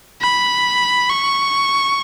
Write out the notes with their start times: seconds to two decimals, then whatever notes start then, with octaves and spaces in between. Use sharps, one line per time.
0.22 B5
1.09 C#6